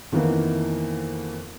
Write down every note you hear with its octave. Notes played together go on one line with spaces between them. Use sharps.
F2 D#3 E3 A#3 B3